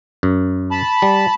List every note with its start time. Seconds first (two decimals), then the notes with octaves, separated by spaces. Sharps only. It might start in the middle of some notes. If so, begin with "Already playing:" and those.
0.23 F#2
0.71 A5 B5
1.02 G3